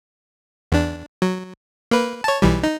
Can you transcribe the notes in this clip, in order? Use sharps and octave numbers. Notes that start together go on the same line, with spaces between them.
E2 D4
F#3
A#3 B4
C#5 A5
B1 E3 G3
D#4